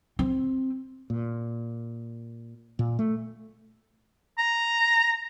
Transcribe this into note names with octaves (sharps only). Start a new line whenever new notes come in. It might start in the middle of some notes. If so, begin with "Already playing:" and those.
C4
A#2
A#2
A3
A#5